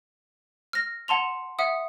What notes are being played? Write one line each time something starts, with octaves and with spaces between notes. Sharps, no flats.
F6 A#6
F#5 A5 C6 F7
E5 F#5 D#6